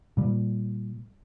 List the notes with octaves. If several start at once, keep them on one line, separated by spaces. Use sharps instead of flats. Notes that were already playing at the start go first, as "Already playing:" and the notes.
A#2 G3